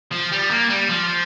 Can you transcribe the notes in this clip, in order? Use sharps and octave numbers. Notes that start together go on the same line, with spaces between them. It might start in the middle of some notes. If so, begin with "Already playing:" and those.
F3
G3
A#3
G3
F3